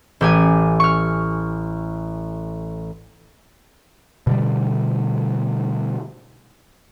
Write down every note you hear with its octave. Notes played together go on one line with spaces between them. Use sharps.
A1 G4 G#5
C#6 F6
B2 D3 G3